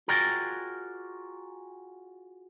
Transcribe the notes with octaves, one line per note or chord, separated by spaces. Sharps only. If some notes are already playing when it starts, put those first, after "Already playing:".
F4 F#4 G#4 A#4 D5 G5